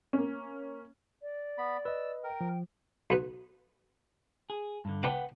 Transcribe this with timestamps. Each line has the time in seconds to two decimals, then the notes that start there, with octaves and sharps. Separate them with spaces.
0.13 A#3 C#4
1.22 D5
1.58 B3 B5
1.85 B4 D#5 E6
2.24 A#4 G5
2.41 F3
3.10 B1 B3 B4
4.50 G#4
4.85 G2 D3
5.03 B3 D4 B4 F#5 G5 D6